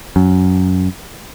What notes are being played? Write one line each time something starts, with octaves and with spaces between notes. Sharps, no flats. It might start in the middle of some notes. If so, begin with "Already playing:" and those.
F#2